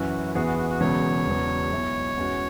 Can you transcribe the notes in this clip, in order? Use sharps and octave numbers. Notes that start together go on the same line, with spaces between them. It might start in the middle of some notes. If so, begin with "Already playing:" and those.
Already playing: F#2 E3 C#4 E4 F#4
E2 E3 B3 F#4 G#4
F#4
F#4
F#4
E1 E2 C#3 F#3 B3 C#5
E1 E2 C#3 F#3 B3
B1 B2 B3 E4
E2 E3 G#3 C#4 F#4